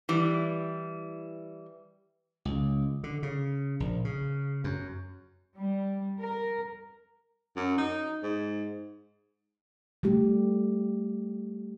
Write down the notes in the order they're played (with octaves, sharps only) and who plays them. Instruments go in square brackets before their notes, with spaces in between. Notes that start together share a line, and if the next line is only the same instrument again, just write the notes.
[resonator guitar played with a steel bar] E3 G3
[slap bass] C#2
D3
C#3
A#1
C#3
F#2
[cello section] G3
A#4
[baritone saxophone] F#2
D#4
G#2
[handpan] G3 A3 G4